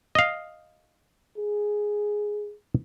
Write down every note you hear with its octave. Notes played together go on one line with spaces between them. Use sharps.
D#5 F5
G#4